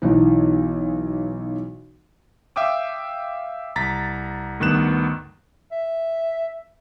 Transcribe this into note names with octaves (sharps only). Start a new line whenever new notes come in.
B1 E3 D#4
E5 F5 G5 D6 D#6
C2 A#5 A6 B6
D2 G2 D#3 B3 F#6 E7
E5